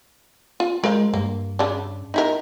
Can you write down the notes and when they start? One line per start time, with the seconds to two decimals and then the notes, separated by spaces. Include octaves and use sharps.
0.60 F4
0.84 G#3 A#4 C5 F5
1.14 G2 A#3
1.59 C#3 D4
2.14 D#4 E4 A#4